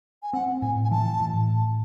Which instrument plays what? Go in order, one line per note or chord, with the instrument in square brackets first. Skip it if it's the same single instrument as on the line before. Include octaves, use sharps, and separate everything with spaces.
[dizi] G#5
[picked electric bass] C4 [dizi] F#5
[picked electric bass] A2 [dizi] G#5
[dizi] G#5
[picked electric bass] E3 [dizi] A5
[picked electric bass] A2